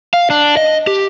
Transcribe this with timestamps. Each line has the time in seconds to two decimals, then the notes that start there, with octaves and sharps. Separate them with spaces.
0.14 F5
0.30 D4
0.57 D#5
0.87 G4